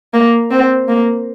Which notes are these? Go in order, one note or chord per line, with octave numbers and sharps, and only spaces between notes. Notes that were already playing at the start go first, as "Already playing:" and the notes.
A#3
C4
A#3